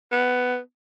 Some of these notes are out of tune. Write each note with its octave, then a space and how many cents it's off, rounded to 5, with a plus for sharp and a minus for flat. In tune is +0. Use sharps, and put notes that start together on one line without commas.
B3 +10